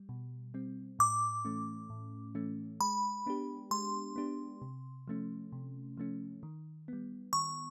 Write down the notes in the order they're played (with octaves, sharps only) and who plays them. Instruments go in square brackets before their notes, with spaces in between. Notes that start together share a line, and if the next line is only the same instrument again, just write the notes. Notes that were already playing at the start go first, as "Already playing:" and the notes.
Already playing: [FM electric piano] G3
B2
G3 C4
[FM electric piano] A2 [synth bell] D6
[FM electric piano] E3 A3 C#4
A2
E3 A3 C#4
[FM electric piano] G#3 [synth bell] B5
[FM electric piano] B3 D4 G4
[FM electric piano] G#3 [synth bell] C6
[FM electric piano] B3 D4 G4
C3
F3 A3 C#4
C3
F3 A3 C#4
D#3
G3 B3
[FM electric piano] D#3 [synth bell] C#6